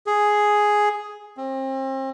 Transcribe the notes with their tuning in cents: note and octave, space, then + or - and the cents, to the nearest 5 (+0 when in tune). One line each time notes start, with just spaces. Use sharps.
G#4 +5
C4 +35